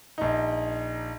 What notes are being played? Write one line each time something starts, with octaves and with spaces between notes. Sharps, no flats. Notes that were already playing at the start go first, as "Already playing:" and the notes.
A#1 D#4